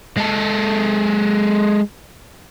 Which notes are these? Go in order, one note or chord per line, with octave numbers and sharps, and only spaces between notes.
G#3 A4